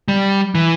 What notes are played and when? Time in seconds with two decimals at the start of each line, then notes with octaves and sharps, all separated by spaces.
0.08 G3
0.55 E3